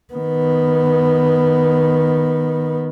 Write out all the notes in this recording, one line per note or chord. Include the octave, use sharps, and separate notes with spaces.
D#3 B3